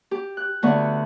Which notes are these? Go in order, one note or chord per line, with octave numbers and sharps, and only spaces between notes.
G4
F#6
D2 D3 B3 C#6